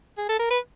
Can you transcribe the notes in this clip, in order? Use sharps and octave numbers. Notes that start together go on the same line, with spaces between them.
G#4
A4
A#4
B4